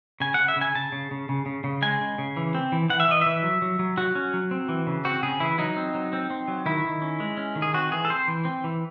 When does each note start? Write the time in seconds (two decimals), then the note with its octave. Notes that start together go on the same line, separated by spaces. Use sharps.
0.20 C#3 G#5
0.34 F#5
0.39 C#3
0.48 E5
0.56 C#3
0.61 G#5
0.75 C#3 A5
0.92 C#3
1.11 C#3
1.29 C#3
1.46 C#3
1.64 C#3
1.82 G#3 G#5
2.01 C#3
2.18 C#3
2.36 E3
2.55 C4
2.72 E3
2.90 E3 F#5
3.00 E5
3.08 E3 D#5
3.22 E3 E5
3.43 F#3
3.62 F#3
3.79 F#3
3.98 F#3 F#4
4.15 C#4
4.34 F#3
4.51 C4
4.69 E3
4.87 C#3
5.05 C4 F#4
5.23 C#3 G#4
5.40 E3 E4
5.58 F#3 D#4
5.77 C4
5.94 F#3
6.13 C4
6.30 C4
6.48 F#3
6.66 D#3 E4
6.85 D#3
7.02 C#4
7.20 G#3
7.37 C#4
7.56 D#3
7.62 G#4
7.74 C4 F#4
7.92 E3 G#4
8.05 A4
8.10 C4 C5
8.28 E3
8.45 C4
8.64 E3